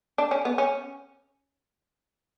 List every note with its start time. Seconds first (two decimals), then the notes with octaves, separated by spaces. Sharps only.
0.18 D4
0.31 C#4
0.45 B3
0.58 C#4